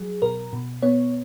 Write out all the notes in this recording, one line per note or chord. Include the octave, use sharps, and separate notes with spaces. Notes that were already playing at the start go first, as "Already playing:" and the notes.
Already playing: F#3 G#4
B2 A#4
B2
B3 C#5